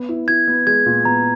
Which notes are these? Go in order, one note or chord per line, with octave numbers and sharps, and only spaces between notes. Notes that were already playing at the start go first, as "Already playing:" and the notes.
Already playing: B3
E4
E4 G#6
B3
G#3 G#6
A#2
B3 A#5